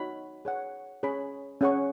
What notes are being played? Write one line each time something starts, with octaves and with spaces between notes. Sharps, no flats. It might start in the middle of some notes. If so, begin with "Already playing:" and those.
Already playing: D#4 F#4 C#5 B5
G#4 C#5 F#5
C#4 G#4 C#5 B5
C#4 G#4 C#5 F#5 C#6